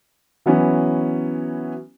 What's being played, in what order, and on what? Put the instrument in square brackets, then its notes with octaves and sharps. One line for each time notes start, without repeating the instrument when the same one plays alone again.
[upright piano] E3 F#3 B3 C#4